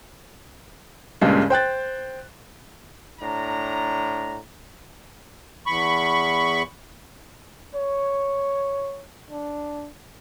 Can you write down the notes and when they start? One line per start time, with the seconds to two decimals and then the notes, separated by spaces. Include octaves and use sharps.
1.21 C#2 G2 A#2 C#3 G#3
1.50 C5 G5 F#6 A6
3.20 A2 D4 A#5
5.66 E2 B5 C#6
7.75 C#5
9.30 D4